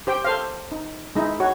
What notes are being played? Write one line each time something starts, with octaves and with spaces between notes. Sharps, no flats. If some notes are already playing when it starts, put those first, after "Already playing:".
G4 C5 G5
A4 C5 F5
D#4
G#3 D#4 E4
F#4 C#5